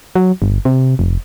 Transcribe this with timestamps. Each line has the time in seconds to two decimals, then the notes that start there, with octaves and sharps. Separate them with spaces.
0.15 F#3
0.42 G1
0.65 C3
0.99 F1